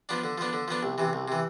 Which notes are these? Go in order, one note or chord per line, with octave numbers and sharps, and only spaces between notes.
F3 B3 D4
D3
F3 B3 D4
D3
F3 B3 D4
C2
C3 E3
C2
C3 E3